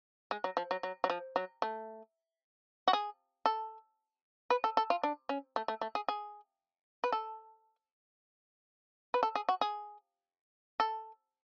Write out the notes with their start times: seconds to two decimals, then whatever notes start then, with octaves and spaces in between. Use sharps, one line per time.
0.31 G#3
0.44 F#3
0.57 F3
0.71 F#3
0.83 F#3
1.04 F#3
1.10 F3
1.36 F#3
1.62 A3
2.88 F#4
2.93 G#4
3.46 A4
4.50 B4
4.64 A4
4.77 A4
4.90 F4
5.03 D4
5.29 C#4
5.56 A3
5.68 A3
5.81 A3
5.95 G#4
6.08 G#4
7.04 B4
7.12 A4
9.14 B4
9.23 A4
9.35 G#4
9.49 F#4
9.61 G#4
10.80 A4